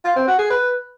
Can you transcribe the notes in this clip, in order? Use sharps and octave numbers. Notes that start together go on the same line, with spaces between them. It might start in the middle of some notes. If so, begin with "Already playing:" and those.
F4
C4
F#4
G#4
B4